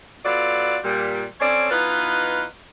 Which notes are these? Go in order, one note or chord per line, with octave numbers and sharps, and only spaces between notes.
F#3 B3 F4 A4 D5
A#2 G3
C4 C#4 A4 C#5 D5
E3 B3 D#4 F4 B4 D#5